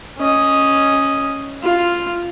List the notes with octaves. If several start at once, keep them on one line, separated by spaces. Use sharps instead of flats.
C#4 D#5
F4